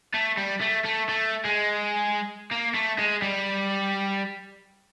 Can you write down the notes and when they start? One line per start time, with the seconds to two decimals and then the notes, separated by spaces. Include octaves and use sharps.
0.14 A3
0.38 G3
0.61 A3
0.85 A3
1.09 A3
1.45 G#3
2.52 A#3
2.75 A3
2.99 G#3
3.22 G3